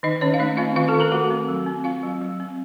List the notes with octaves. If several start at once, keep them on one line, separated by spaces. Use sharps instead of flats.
D#3 D#4 D#5
D#3 C#4 C#5
F5
A3 D#4 D#5
C4 F4 F5
D#3 F4 F5
A4 A5
D#3
A#4 A#5
A3 F#4 F#5
C4
F#3
C4
C4 F4 F5
F#3
F#3
C4